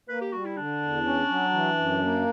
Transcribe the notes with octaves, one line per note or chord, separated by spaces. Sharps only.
A#3 B4
G4
G3 F#4
E4
D3 D4
E2
C#4
F#3
E3
F#2
A#3